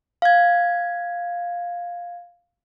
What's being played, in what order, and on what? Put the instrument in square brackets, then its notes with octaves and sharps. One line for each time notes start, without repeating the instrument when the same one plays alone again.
[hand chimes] F5 G#6